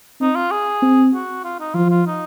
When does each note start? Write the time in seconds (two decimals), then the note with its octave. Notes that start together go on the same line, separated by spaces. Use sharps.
0.20 C4 D#4
0.35 F4
0.51 G#4
0.82 C4
1.14 F#4
1.44 F4
1.60 D#4
1.74 F3 F4
1.90 F4
2.06 D#4